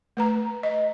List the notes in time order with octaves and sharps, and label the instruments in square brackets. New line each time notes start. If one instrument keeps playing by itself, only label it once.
[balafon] A3 B4 A#5
D#5